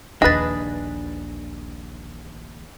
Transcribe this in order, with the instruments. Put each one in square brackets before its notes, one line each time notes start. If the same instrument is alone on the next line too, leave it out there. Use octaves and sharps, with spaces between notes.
[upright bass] A#1 D#2 [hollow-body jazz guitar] D4 [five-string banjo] G#4 B4 [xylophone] D#5 A6